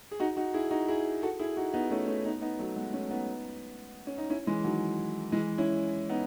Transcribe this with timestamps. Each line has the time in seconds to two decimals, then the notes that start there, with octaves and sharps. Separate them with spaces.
0.11 G#4
0.20 D#4 F#4
0.37 D#4 F#4
0.54 E4 G#4
0.71 D#4 F#4
0.88 E4 G#4
1.23 F#4 A4
1.40 E4 G#4
1.57 D#4 F#4
1.74 B3 D#4
1.91 A3 C#4
2.08 A3 C#4
2.25 B3 D#4
2.41 B3 D#4
2.59 F#3 A3
2.76 G#3 B3
2.93 A3 C#4
3.10 B3 D#4
4.07 C#4
4.18 D#4
4.30 C#4 E4
4.47 E3 G#3
4.64 D#3 F#3
5.32 E3 G#3
5.58 C#4 E4
6.09 B3 D#4